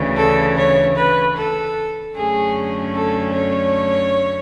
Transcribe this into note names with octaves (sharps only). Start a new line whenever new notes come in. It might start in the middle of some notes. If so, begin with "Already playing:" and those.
Already playing: D2 C#3 E3
A4
C#5
B4
A4
F#2 D3 A3 C#4 G#4
A4
C#5